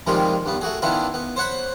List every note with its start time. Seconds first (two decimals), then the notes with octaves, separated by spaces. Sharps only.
0.07 C3 D#3 F3 G3 G#3 F4
0.46 G2 B3
0.61 A3 F#4 G#4
0.82 D#3 B3 C#4 D4 E4 F4
1.14 B3
1.36 C5 C#5 F#5 B5